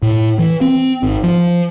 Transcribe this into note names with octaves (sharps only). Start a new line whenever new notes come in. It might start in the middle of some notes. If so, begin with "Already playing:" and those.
A2
E3
C4
G#1
F3